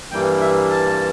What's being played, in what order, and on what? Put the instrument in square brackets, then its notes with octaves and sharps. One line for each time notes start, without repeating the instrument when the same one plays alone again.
[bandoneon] G2 E3 G3 A#3 G5
E5
A5